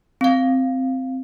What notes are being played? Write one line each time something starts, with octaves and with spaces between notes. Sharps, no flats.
C4 F5